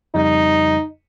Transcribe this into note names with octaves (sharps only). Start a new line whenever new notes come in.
F2 C#3 G3 D#4